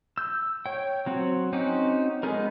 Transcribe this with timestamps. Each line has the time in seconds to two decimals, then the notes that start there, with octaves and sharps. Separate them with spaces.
0.18 E6 G6
0.66 C#5 G5
1.06 F#3 C4 F#4
1.53 C4 C#4 D#4 F#4 D6
2.23 G#3 B3 D#4 G#4 A#4